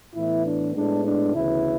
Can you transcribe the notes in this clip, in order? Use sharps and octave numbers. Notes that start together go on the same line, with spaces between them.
A2 E3 B3 E4
D4
A2 G#3 B3 D4
D4
D2 C#3 E3 B3 E4